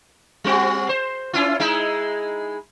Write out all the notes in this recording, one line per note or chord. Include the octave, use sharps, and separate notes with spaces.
G3 C4 F#4
C5
C#4 E4 F4
G#3 D#4 E4